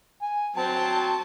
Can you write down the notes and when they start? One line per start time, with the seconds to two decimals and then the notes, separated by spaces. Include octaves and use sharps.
0.22 G#5
0.56 F#3 C4 C5 A5